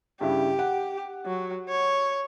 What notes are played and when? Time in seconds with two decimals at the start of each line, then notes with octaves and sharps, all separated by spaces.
0.21 G2 C#3 E4 G4
0.59 F#5
1.26 F#3
1.69 C#5